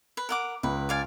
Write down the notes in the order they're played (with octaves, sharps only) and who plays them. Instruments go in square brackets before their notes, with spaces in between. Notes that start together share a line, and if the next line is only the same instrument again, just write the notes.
[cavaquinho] B4
A#4 F#5 D6
[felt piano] C#2 [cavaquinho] B4
[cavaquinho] D5 F5 G#5